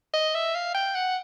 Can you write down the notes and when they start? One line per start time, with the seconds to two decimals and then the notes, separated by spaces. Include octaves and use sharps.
0.14 D#5
0.35 E5
0.55 F5
0.74 G5
0.95 F#5